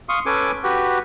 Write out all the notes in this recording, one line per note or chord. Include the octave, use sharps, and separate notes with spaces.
F5 C6 C#6 D#6
C#4 A4 B4 G#5 D6
F#4 G4 B4